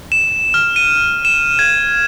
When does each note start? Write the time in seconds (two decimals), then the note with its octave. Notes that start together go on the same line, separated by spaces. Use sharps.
0.12 E7
0.54 F6
0.76 D#7
1.25 E7
1.59 G#6